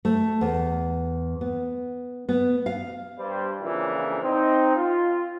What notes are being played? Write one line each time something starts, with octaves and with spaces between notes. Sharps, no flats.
A3
E2
B3
B3
F5
G2 G3 C5
F2 A#2 C#3 E3 F3 D4
C4 D#4
F4